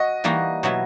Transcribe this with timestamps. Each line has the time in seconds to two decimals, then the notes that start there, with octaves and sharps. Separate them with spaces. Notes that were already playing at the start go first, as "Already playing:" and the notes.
Already playing: F#4 D#5
0.24 E3 G3 A#3 D#4 F#4
0.63 B2 F#3 B3 E4